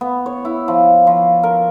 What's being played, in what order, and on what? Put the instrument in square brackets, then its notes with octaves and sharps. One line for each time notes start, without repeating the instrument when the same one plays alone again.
[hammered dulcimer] B3
C#5
E4
F3
F3
A#4